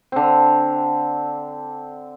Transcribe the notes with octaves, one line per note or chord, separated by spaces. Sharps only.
D3 C4